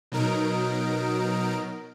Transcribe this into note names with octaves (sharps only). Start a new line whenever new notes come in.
B2 F#3 D#4 A#4 D7